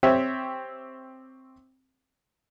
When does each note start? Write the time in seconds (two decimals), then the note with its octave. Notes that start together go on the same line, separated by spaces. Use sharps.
0.03 C4 G4 C5 C#5 E5